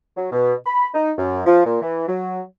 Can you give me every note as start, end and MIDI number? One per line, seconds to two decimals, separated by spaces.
0.17 0.28 54
0.32 0.54 47
0.66 0.89 83
0.94 1.12 63
1.18 1.41 42
1.46 1.64 53
1.65 1.78 46
1.82 2.05 52
2.08 2.41 54